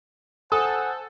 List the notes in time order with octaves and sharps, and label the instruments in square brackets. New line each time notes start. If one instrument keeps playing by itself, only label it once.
[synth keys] A4 [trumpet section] C5 F#5 G#5 [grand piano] D#6